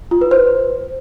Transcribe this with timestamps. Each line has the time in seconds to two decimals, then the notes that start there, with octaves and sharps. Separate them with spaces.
0.11 F4
0.21 B4
0.31 C5